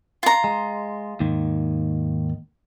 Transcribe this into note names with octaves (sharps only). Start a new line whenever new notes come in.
F4 A#5
G#3
D#2 G#2 D#3